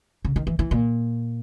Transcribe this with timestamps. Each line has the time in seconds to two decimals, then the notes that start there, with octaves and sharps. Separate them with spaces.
0.25 C#3
0.36 D#3
0.47 E3
0.59 E3
0.71 A#2